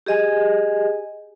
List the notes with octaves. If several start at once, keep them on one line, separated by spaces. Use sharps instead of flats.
G4 G#4 D#5 G#5